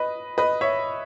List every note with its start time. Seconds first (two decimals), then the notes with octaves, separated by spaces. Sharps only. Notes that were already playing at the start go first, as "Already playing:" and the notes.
Already playing: B4 D#5
0.38 B4 D#5
0.61 C#5 E5